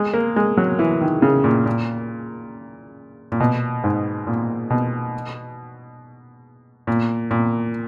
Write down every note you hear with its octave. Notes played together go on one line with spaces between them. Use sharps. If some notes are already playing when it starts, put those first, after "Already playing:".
Already playing: G#3
A#3
G#3
F#3
E3
D#3
C#3
A#2
A#2
A#2
B2
G#2
A#2
B2
A#2
A#2